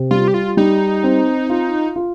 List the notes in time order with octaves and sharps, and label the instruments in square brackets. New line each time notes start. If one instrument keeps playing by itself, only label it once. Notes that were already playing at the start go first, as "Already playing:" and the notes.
Already playing: [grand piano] C3
[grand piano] G3 [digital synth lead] F4
[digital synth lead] G4
F4
[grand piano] G3 [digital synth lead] D#4
[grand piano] C4
F4
F4